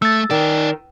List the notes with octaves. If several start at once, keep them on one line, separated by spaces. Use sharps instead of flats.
A3 E6 A6
D#3 D#4 D5